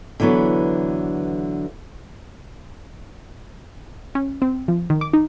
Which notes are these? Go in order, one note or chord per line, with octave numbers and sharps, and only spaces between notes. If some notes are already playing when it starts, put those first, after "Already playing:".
D3 E3 F#3 B3
C#4
C4
F3
D#3
D6
D#4